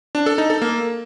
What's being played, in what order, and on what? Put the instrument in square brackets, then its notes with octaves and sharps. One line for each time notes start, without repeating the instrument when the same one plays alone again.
[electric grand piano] D4
A4
D#4
A4
A#3